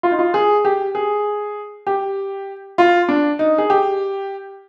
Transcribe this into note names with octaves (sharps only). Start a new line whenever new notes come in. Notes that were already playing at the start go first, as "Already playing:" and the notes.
F4
D#4
F4
G#4
G4
G#4
G4
F4
D4
D#4
G#4
G4